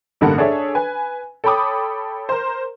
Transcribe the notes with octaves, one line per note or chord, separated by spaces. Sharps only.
A1 G2 D3 A#3 A4 F#5
D4 G#4 A4 C#5 E5
B4 G#5
A4 C#5 G5 B5 D6 D#6
A#4 C5